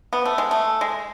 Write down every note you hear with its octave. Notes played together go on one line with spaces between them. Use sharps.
B3
A3
G#3
A3
G#3